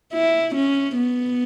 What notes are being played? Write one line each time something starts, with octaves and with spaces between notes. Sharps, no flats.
E4
C#4
B3